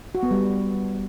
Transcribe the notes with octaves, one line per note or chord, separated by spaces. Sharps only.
F#4
B3
G3